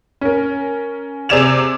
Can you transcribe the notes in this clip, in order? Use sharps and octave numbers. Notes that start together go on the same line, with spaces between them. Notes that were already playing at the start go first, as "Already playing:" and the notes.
C#4 A#4
C3 G#4 D5 G#6 E7 F7